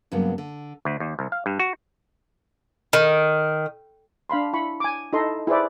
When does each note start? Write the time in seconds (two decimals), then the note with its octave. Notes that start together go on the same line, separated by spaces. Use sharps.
0.12 G2 C#3 F#3 A#3 B3
0.38 D3
0.85 D2
1.00 D#2
1.19 C2
1.32 F5
1.46 G2
1.59 F#4
2.93 D#3
4.30 D4 F5 B5 C6
4.53 E4 B5 C#6
4.80 G#5 D6
5.13 D#4 E4 A4 D#5 C6
5.47 E4 G#4 B4 C5 D5 E5